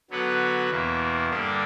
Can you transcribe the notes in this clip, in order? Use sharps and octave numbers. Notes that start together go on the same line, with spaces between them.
D3 F#3 B3 F#4 B4
E2 B2 A#3 E4
G2 D3 G3 A#3 D4